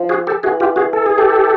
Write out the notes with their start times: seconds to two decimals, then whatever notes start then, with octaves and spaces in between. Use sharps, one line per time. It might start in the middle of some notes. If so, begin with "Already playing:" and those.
Already playing: F3
0.09 F#4 G#4
0.27 G4 A4
0.43 E3 F#4 G#4
0.60 F4 G4
0.76 F#4 G#4
0.93 A4
1.06 G#4
1.18 G4 A4